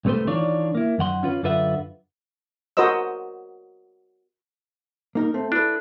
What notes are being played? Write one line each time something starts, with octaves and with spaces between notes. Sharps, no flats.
C2 C3 A3 B4 C5
D#3 E3 D4 F4 C#5 D5
A#3 E4
F#2 D#3 F#5 C6
C#4 F4 B4
F#2 D3 F4 B4 E5 F#5
F#4 A#4 C5 D#5 E6
A#3 D#4 A#4
A3 C4
D4 E4 A4 B4